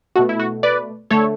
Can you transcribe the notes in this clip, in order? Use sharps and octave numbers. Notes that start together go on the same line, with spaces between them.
B2 A3 F#4
E4
F#4
B4 D5
D3 A3 A4 C#5